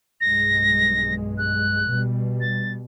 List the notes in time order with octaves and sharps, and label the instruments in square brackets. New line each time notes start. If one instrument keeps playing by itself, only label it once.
[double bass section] B1 G2 G#3 [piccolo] A#6
[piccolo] F#6
[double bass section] B2 G3
[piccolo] A6